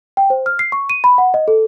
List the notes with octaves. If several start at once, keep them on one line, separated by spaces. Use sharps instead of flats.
G5
C5
F6
C7
C#6
D#7
B5
F#5
D#5
A4